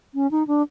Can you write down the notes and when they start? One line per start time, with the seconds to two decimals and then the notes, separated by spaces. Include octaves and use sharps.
0.14 C#4
0.31 D#4
0.47 D4